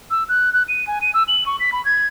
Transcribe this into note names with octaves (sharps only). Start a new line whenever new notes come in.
E6
F#6
F#6
D#7
G#5
D#7
E6
F#7
C#6
B6
B5
G#6